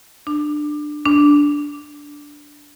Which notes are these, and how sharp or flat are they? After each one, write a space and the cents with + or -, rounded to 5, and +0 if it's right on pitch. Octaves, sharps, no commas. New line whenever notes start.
D4 +20
D4 -5